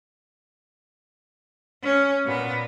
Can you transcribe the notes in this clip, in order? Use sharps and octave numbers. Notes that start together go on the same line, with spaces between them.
C#4
A#2 B3